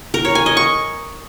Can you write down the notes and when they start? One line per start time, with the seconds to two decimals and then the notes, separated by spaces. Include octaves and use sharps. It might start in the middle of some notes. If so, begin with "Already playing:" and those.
0.14 A#4
0.25 C#5
0.35 G#5
0.46 D#5
0.57 C#6